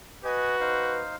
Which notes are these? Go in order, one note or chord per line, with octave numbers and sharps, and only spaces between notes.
F#4 B4 D#5 G#5
D#4 C5 F5